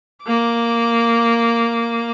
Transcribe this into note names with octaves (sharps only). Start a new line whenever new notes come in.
A#3 D6